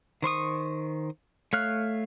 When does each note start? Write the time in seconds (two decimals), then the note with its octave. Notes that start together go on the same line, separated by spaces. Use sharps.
0.22 D#3 C5 C#6 D#6
1.53 A3 C#5 F5 F6 F#6